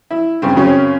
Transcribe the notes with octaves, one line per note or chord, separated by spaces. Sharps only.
E4
G2 C#3 C4
F#2 C#3 C4 C#4